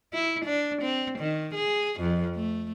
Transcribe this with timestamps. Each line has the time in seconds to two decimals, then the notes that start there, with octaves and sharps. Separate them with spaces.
0.13 E4
0.45 D4
0.82 C4
1.19 D#3
1.55 G#4
2.01 F2
2.36 A3